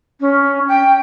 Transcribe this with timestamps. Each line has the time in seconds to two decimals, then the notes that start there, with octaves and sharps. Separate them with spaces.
0.21 C#4
0.68 G5